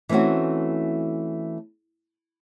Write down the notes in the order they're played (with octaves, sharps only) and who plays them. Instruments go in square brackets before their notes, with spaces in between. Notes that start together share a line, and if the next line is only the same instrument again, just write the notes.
[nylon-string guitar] E3 A3 C4 C#4 F#4